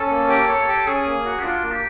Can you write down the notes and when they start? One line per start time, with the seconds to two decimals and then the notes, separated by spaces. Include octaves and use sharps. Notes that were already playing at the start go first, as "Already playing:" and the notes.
Already playing: C#4 A4
0.09 A#3
0.28 G4
0.48 C#5
0.68 G4
0.86 C#4 G#4
1.05 A#3
1.25 F#4
1.39 C#4
1.43 D4 F4
1.63 A#3
1.72 G4